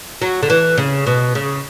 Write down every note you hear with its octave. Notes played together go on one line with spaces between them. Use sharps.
F#3
D3
E3
C#3
B2
C#3